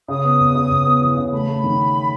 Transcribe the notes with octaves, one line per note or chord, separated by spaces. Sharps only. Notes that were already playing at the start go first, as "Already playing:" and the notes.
C#3 D#6
B3
E2
C#3
E2
B3
E3
C#3
A3 B5
A3
D#3